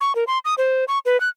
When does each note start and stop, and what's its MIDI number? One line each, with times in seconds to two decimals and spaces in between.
0.01 0.15 85
0.15 0.24 70
0.27 0.39 84
0.45 0.54 87
0.58 0.85 72
0.88 0.99 85
1.06 1.20 71
1.21 1.29 90